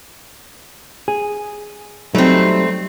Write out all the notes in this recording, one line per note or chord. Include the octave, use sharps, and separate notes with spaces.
G#4
F#3 G3 A3 C4 D#4